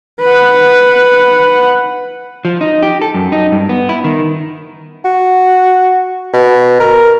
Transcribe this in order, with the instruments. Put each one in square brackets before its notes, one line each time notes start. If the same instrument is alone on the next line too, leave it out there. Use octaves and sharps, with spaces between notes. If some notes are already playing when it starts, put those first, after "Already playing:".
[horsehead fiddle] B4 F#5
[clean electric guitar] F3
D#4
G4
A4
F#2
D#4
G2
B3
E4
D#3
[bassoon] F#4
B2
A#4